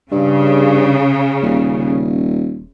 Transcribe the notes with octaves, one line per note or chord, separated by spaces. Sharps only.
G2 C#3
D#1